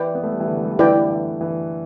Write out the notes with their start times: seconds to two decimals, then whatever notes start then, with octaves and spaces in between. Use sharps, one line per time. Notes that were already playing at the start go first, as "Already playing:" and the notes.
Already playing: E3 B4 D5 G5
0.15 B3
0.23 A3
0.32 G3
0.40 E3
0.48 D3
0.57 A3
0.65 G3
0.72 E3
0.79 D3 E4 B4 D5 G5
1.10 E3
1.41 E3